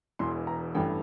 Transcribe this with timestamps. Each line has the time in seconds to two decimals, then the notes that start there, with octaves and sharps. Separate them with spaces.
0.19 E1 E2 E3 C6
0.47 A#5
0.75 A1 G2 E3 A3 G5